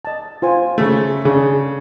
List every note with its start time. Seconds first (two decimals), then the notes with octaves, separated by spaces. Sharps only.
0.05 D#5 A5
0.42 F4 C5 G#5
0.78 C#3 A3
1.25 C#3 D4 G#4